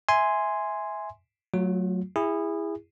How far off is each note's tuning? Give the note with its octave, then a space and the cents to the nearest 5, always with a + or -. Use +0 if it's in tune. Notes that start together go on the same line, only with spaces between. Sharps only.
E5 -15 G#5 +0 C6 -5
F#3 +0 A3 +0 F4 +35
E4 +5 G#4 -25